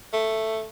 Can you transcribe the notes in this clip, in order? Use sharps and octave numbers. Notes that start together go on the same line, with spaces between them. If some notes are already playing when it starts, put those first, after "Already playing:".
A3